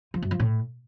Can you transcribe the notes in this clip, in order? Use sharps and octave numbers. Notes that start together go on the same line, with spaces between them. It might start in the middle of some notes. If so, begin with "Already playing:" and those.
F3
F#2
F3
A2